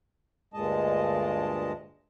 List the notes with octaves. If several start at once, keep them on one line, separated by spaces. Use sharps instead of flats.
D2 G2 A#2 G#3 D#5 A5